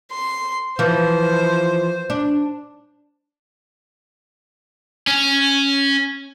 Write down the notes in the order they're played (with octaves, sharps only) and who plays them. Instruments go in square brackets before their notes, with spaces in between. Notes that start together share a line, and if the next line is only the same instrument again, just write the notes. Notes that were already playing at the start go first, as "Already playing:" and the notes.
[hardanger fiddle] C6
[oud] E3 F3 [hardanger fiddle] C5
[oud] D4
[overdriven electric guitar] C#4